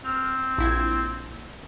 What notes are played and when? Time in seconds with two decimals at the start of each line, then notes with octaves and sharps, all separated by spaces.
0.05 C4 F6
0.58 A#1 E4 G#6